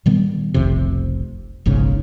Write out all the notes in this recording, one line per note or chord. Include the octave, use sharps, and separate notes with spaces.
A#2 D#3 G3 B3
F1 B1 F2 C3
F#1 B1 G#2 C#3